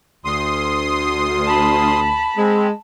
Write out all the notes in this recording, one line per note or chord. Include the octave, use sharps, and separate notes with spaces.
D2 C6 D#6
A5 B5
G#3 C4